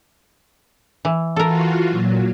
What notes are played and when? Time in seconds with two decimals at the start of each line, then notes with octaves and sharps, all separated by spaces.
1.05 E3
1.36 E3 F4 F#4 A4 A#4
1.88 A#2 F#3